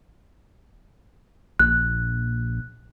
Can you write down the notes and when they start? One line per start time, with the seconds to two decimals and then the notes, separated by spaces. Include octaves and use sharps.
1.60 A#1 F#6